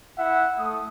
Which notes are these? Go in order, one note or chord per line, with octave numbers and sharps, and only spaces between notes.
E4 E5 F#5
A3 D#6